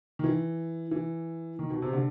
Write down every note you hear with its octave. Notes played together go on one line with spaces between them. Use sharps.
D#3
E3
E3
D#3
B2
C3
D3